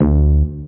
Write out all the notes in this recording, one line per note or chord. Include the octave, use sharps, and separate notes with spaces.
D2